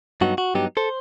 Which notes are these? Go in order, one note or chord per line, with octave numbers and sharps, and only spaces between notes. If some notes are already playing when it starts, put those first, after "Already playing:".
G2 F#3 B3 D#4 F#4
F#4
G2 F#3 B3 D#4 G4
A4 C5